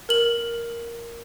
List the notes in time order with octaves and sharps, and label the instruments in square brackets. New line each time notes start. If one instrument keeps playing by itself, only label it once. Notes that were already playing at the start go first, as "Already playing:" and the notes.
[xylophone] A#4 F#7